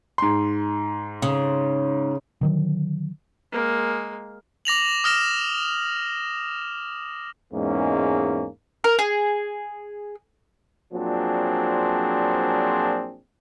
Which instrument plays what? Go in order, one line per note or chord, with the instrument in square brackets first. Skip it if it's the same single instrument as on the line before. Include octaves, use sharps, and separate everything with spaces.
[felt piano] G#2 C6
[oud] C#3
[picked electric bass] D3 D#3 F#3
[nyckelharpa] G#3 A#3
[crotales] D6 A#6 F7 F#7
D#6 F6 A#6 E7
[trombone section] E2 G#2 G#3 A#3 C#4
[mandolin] A#4
G#4
[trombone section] A#2 F3 F#3 C4 D4 G#4